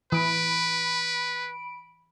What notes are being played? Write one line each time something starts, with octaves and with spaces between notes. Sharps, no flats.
E3 B4 B5 D7